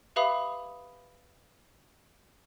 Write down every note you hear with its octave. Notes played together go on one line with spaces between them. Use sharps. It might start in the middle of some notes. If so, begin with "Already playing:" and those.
G4 B4 E5 F5 B5 D#6